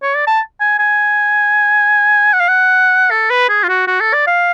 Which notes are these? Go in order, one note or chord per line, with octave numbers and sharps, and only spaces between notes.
C#5
D5
A5
G#5
G#5
F#5
F5
F#5
A4
B4
G#4
F4
F#4
F#4
A4
D5
F5